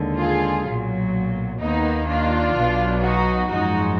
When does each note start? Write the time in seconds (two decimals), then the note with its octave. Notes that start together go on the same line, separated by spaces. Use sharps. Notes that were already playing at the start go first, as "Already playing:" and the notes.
Already playing: D#2 D3 G#3
0.18 F4 G#4
0.66 B1 A#2 F#3
1.60 D#2 D#3 A#3 B3 D#4
2.08 D4 F4
2.55 B1 B2 F#3
3.02 D#4 F#4
3.49 G#1 F#2 F3 G#3 D#4 F#4